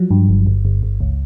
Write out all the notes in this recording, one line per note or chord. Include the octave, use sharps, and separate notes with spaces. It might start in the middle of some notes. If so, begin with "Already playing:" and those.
Already playing: F3 F#3
G2
G1
G1
G1
G1
C#2